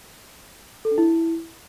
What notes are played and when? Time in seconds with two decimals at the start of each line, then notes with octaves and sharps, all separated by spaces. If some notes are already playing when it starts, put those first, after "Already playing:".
0.85 A4
0.91 D4
0.98 E4